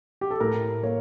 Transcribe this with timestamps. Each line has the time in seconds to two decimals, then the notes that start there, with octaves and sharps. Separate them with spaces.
0.21 G4
0.31 A4
0.40 A2 A#4
0.83 A#3 C#5